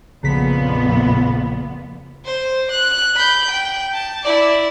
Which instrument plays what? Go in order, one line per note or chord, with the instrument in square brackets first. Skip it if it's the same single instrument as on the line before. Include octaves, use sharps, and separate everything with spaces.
[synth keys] A#1 C#3 B6 [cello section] F2 A#2 B3
[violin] C5
F#6
B5 G6
G5
A5
E4 D5